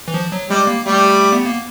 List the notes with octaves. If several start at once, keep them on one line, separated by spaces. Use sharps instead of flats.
E3
F3
F#3
G3 G#3
A#3
G3 A3
B3
A#3